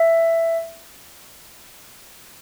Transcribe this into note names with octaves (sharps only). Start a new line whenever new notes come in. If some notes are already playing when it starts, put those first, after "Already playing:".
Already playing: E5